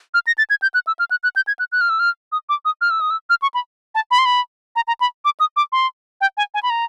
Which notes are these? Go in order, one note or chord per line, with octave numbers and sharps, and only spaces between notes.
F6
A#6
A6
G#6
G6
F#6
E6
F6
F#6
F#6
G6
G#6
F#6
F#6
F6
E6
F6
D#6
D6
D#6
F6
E6
D#6
E6
F6
C#6
B5
A5
B5
C6
B5
A#5
A#5
B5
D6
D#6
D6
C6
G5
G#5
G#5
B5
A#5